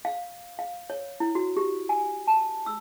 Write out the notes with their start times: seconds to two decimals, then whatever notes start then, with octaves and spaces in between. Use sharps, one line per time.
0.05 F5
0.59 F5
0.90 C#5
1.20 E4
1.35 F#4
1.57 G4
1.89 G#5
2.27 A5
2.66 E6